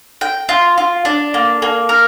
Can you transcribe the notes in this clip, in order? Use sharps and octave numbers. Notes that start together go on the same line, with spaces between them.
G5
F4
F4
D4
A#3
A#3
A#4